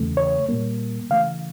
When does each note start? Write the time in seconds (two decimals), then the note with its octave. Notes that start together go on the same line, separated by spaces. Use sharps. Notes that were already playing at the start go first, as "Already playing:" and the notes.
Already playing: E2 C#3 E3 A3
0.17 C#5
0.49 A#2 G3 A#3
1.10 C#3 E3 A3 F5